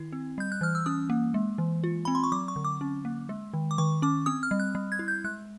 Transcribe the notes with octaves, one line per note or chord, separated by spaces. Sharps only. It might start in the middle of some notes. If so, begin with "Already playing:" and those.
Already playing: D#3 E4
C4
G3 G6
F#6
E3 F6
E6
C#4 D#6
A#3
G#3
E3
F4
C4 B5
C6
C#6
F#3 D6
C#6
D3
D6
C#4
A#3
G#3
D#3
D6
D#3 C#6
C#4 D6
C4 D#6
F6
G3
F#6
G3
G#6
E4
G6
G#3 F#6